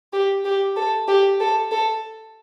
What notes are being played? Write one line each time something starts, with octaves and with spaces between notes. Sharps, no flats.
G4
G4
A4
G4
A4
A4